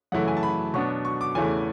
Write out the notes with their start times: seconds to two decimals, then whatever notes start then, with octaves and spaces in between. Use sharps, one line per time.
0.12 F#2 C#3 E3 A3 F#5
0.28 G#5
0.37 A5
0.43 B5
0.74 B2 F#3 B3 D4 C#6
1.05 C#6
1.21 D6
1.35 E2 C#3 E3 A3 G#5